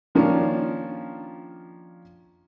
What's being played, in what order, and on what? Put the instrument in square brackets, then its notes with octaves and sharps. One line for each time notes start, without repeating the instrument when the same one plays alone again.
[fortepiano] D#3 F3 A#3 C#4 D4